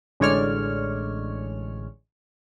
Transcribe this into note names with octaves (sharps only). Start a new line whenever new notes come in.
A1 D3 G#3 C#5 D5 F6